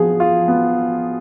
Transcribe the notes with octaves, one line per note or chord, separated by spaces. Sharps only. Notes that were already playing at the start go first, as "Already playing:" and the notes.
Already playing: F3 B3 G#4
F4
B3